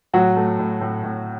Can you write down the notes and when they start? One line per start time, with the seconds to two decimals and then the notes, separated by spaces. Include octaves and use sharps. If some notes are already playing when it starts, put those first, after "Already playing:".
0.14 A2 F#3 F#4
0.37 A3
0.59 A2
0.81 A2
1.04 A2